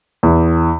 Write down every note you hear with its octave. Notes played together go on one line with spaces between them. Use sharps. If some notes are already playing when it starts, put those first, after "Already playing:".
E2